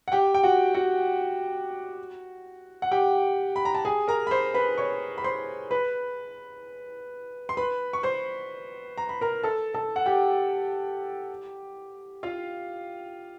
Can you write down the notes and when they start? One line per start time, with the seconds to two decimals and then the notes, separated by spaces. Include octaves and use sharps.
0.08 F#5
0.12 G4 G5
0.34 G5
0.43 F#4 F#5
0.74 F#4 F#5
2.82 F#5
2.91 G4 G5
3.56 B5
3.65 A#5
3.75 A5
3.85 G#4 G#5
4.08 A#4 A#5
4.27 B5
4.31 C5 C6
4.54 B4 B5
4.78 C#5 C#6
5.18 B5
5.24 C5 C6
5.71 B4 B5
7.49 C6
7.57 B4 B5
7.93 C#6
8.03 C5 C6
8.98 A#5
9.09 B5
9.21 A#4 A#5
9.44 A4 A5
9.74 A4 A5
9.96 F#5
10.06 G4 G5
12.23 F4 F5